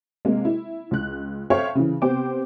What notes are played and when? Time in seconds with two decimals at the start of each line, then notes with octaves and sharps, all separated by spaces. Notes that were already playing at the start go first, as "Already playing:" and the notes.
0.25 C3 G#3 A#3
0.45 E4
0.91 C#2 F#6
1.50 A4 C5 C#5 E5 F5 G5
1.75 C#3 E3
2.02 C3 B3 G4 C5 G5 D6